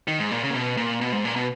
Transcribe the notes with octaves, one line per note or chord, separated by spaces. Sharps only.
D#3
G#2
A#2
C#3
A#2
B2
A#2
B2
G#2
A#2
B2